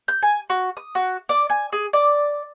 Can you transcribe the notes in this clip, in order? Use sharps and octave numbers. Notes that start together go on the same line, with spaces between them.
G6
G#5
F#4
D#6
F#4
D5
G#5
G#4
D5